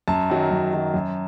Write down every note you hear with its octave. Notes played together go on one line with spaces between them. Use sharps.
F#2 A5
D#3 F#3
F#2
D#3 F#3
F#2